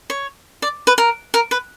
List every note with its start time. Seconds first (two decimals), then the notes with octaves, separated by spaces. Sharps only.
0.10 C#5
0.62 D5
0.87 B4
0.98 A#4
1.34 A#4
1.51 B4